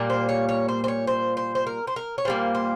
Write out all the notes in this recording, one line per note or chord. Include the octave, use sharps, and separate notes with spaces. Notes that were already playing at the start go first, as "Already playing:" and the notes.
Already playing: A#2 G3 A#3
C5
C#5
C#5
C5
C5
C#5
C5
C5
C5
A#4
C5
A#4
C#5
A#2 G3 A#3 C5
C5